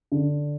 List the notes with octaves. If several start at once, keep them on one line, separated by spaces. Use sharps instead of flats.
D3